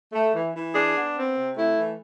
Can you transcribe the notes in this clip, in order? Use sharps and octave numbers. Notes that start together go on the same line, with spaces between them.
A3
E3
E3
D4 G#4
B3
C4
C3
A3 E4
E3